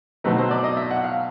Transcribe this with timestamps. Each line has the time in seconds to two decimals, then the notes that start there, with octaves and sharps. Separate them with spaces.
0.24 B2 F#3 A3 C4 D#4 B4
0.38 C5
0.51 D5
0.64 D#5
0.77 E5
0.91 F#5
1.04 F5